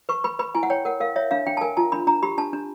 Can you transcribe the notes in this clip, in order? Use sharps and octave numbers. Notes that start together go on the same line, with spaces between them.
B4 C#6
B4 B5
B4 B5
E4 G#5
F#5
C#5 G5
A#4 F#5
A#4 F5
C#5 E5
D4 F5
D4 G5
A5
A#4 G#5
F4 A5
D4 B5
D4 A#5
G4 B5
D4 A5
D4